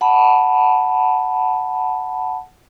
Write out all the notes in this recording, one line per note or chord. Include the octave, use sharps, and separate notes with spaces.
F#5 A5 B5